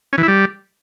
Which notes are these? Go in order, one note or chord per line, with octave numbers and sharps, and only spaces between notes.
C#4
E3
E4
G3